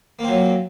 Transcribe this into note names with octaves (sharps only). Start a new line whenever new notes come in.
A#2 F#3 A#3 C4